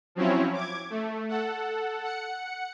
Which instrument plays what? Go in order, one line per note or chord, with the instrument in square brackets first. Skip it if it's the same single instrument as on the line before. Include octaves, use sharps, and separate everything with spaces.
[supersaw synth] F3 F#3 C4 C#4 E4 C#5
D6 G#6
A3
A4 F#5
F#5 C#7